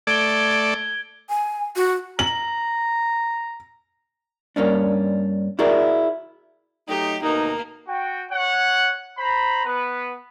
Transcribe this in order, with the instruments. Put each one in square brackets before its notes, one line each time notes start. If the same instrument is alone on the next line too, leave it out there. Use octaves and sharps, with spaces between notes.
[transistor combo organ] A3 D5 [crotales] G#6 D7 G7
[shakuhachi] G#5
F#4
[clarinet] A#5 [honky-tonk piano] F#7
[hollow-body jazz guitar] G2 A#3 C#4 D4
E4 F#4 G#4 A#4 D5
[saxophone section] F#3 A3 D#4 [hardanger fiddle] G4
[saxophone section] D2 B2 D#4 [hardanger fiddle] A#3
[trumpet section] F#4 G5
C#5 F#5
C5 A#5 B5
B3 B4